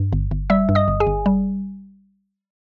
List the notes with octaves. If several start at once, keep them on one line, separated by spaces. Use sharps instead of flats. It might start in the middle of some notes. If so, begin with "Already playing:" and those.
Already playing: G2
G1
G1
G3 E5 E6
G2
D#5 D#6
G1
G#4 G#5
G1
G3